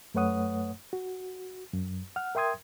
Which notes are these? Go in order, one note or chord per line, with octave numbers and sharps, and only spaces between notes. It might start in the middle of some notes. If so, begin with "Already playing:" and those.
F#2 A3 B4 C#5 F#5 D#6
F#4
F#2
F#5 F6
A#4 E5 G5 C6 D#6 G#6